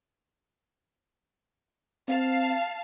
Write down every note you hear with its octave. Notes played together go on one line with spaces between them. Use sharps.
C4 F5 A5